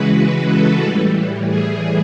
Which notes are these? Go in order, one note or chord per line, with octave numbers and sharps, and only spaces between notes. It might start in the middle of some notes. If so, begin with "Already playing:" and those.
Already playing: C#3 E3 G#3 F#4 B4
B4
A4
A2 E3 G3
G#4